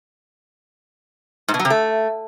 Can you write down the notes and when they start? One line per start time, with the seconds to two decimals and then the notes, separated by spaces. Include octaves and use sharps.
1.48 G#2
1.54 B2
1.59 F#3
1.65 C3
1.70 A3